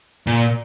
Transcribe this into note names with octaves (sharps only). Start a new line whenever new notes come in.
A#2